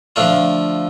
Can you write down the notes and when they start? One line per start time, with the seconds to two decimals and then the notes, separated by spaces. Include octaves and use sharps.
0.16 D3 F3 A3 D4 F4